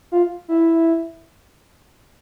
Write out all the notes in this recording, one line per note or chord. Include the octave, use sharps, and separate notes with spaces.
F4
E4